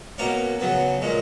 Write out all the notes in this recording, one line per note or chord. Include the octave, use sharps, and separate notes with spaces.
B2 A#3 C#4 C#5
C#3 F#3 B3
A#2 G#3 C#4